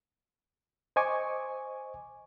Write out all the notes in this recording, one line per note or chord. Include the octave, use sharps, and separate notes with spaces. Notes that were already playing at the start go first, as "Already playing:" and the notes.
C5 D#5 G#5 C#6 D6